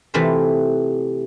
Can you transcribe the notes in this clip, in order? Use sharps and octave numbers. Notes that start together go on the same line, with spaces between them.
C3 E3 A3 F4 C5